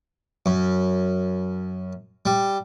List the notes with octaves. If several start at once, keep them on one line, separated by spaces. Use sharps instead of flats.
F#2
G3